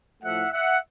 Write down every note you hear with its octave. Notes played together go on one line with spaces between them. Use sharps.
A2 F3 A3 E5 F#5
E5 F#5